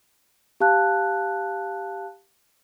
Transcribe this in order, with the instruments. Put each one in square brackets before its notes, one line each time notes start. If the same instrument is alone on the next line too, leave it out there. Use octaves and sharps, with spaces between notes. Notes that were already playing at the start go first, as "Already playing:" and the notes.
[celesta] G4 F5 A5 F#6